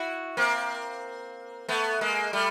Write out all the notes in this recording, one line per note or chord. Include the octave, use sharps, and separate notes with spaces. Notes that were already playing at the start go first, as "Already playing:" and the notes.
Already playing: E4 F#4
A#3 C4
A3 B3
G#3 A#3
G3 A3